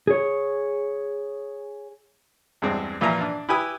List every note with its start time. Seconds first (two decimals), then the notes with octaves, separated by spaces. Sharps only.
0.07 G#4 C#5
2.62 E2 G2 G#3 C4 D4
3.01 A#2 E3 F3 F4 E5 A#5
3.21 D4
3.49 E4 G4 B4 G#5 D#6